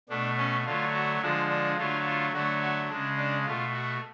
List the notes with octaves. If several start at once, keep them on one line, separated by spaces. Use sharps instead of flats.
B2 A3 D4
C#4
D3 F#3 A3 F4
F#4
D3 F3 G#3 D4
D4
D3 F#3 A3 F4
F4
D3 F#3 A3 F#4
F#4
C#3 G#3 D4
D4
B2 A3 F4
F#4